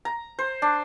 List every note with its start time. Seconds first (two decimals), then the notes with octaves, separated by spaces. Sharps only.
0.05 A#5
0.39 C5
0.62 D4